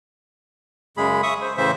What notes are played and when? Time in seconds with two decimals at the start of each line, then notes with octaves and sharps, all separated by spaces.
0.97 F#2 C#3 G#3 G#4 B5
1.23 E5 C#6 D#6
1.41 C5
1.57 A2 C#3 E3 C5 E5